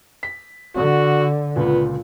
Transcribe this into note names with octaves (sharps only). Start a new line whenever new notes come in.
B6
D3 F#4
C#2 A#2 B3